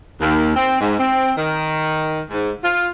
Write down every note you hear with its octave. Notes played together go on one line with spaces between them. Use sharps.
D#2
C4
G#2
C4
D#3
G#2
F4